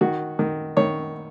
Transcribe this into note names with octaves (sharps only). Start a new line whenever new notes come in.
D#3 F#4
D#3
D#3 C#5